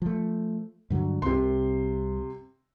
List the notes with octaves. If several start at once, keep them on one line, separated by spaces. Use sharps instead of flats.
F3 A3
G2 D3 F#3
C2 C3 C4 C6